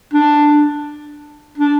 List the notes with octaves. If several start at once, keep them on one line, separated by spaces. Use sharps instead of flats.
D4
D4